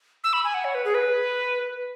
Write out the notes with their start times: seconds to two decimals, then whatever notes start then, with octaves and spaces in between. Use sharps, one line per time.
0.24 E6
0.33 B5
0.44 G#5
0.54 F#5
0.65 C#5
0.75 B4
0.85 G#4
0.94 B4